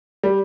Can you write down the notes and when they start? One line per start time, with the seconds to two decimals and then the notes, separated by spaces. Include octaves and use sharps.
0.23 G3